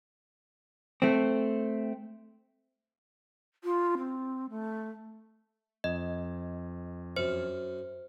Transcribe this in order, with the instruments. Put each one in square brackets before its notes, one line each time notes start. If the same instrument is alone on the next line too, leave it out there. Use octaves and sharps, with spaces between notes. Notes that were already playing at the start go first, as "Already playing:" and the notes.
[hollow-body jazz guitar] A3 C4
[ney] F4
C4
A3
[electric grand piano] F2 [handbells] D#5
[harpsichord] F#2 [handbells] C5